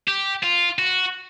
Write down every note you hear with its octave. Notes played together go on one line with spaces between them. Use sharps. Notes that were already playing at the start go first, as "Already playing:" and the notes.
G4
F4
F#4